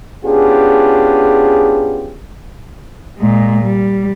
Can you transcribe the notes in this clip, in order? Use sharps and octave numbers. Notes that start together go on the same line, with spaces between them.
B3 C#4 D4 F4 G4 G#4
A#2 G#3
G3